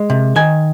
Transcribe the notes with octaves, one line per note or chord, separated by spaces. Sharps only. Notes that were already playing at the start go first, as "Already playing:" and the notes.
Already playing: G#3
C3
D#3 G#5